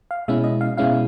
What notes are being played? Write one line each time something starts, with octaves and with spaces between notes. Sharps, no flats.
F5
B2 G#3 C#4 E4 E5
D#5
F5
B2 G#3 C#4 E4 F5